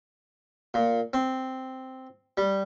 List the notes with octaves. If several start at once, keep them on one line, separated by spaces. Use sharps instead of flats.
A#2
C4
G3